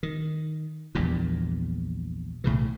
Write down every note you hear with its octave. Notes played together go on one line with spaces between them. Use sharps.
D#3
A#1 E2 G2 A#2
B1 A2 C#3 E3